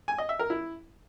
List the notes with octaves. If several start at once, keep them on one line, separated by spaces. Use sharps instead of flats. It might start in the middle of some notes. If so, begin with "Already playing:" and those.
G#5
D#5
E5
A#4
E4